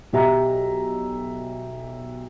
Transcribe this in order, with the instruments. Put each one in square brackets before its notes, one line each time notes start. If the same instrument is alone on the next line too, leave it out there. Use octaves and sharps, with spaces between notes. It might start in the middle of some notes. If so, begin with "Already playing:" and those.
[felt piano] B1 G4 E5 A#5